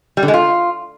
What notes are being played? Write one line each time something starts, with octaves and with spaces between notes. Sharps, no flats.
G3
D3
G#3
F4